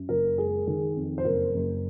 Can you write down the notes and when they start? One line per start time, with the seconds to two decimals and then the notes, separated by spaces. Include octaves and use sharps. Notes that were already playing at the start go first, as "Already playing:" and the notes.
Already playing: F#2
0.09 F#1 A#4
0.38 G#3 G#4
0.67 D#3 G#4
0.96 F2
1.18 C5
1.25 F#1 A#4
1.54 F#1